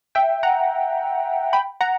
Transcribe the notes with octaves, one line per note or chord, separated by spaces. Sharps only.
E5 G5
F#5 A#5
G5 B5
F#5 A#5